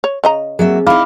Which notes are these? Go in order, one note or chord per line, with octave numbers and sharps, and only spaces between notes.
C#5
C#3 D#5 A#5
F#3 A#3 C4 G#4 E5
D#4 E4 F5 B5 D6 F6